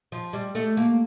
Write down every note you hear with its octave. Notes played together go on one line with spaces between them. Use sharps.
F3
G3
A3
A#3